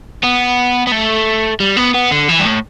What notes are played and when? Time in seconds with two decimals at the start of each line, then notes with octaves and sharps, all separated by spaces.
0.24 B3
0.87 B3
0.92 A3
1.60 G3
1.77 B3
1.94 B3
2.12 D3
2.29 E3
2.39 G2
2.46 A2